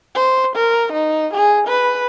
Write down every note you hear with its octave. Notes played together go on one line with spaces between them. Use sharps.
C5
A#4
D#4
G#4
B4